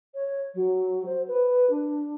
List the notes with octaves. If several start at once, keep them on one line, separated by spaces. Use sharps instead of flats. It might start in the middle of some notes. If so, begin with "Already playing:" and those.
C#5
F#3
C5
B4
D4